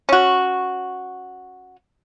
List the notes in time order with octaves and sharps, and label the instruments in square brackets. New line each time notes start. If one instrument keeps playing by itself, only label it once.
[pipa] C#4 F#4